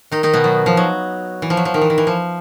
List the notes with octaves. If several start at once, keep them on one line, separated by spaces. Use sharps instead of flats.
D#3 D#4
D#3 D#4
B2 B3
F#3
F3
F#3
E3
F3
F#3
F3
D#3
E3
D#3
E3
F3